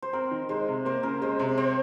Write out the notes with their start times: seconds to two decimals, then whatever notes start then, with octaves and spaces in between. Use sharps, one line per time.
0.02 C5
0.13 C4 A#4
0.31 D#3
0.49 G#3 C5
0.68 C3
0.85 A#3 C5
1.03 C#3 A#4
1.21 G#3 C5
1.39 C3 C5
1.58 C4 C5